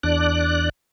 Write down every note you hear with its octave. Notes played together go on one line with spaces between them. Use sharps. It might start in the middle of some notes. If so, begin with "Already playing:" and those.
E2 D4 D5 F#6